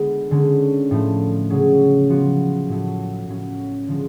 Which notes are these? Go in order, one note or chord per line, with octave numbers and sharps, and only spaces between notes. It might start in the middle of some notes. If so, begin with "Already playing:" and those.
Already playing: D3 G#3 B3
D3 G#3 C#4
A2 F3 A3
C#3 F#3 C#4 G#4
F3 B3 F#4
A2 F#3 A3
A2 F#3 C#4
D3 F3 G#3